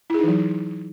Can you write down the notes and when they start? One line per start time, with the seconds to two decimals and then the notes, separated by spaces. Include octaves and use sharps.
0.10 E4
0.14 G#4
0.19 D#4
0.23 E3
0.28 F#3